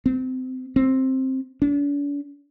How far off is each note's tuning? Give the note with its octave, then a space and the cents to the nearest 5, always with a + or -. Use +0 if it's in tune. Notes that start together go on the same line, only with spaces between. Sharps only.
C4 -25
C4 +10
D4 -45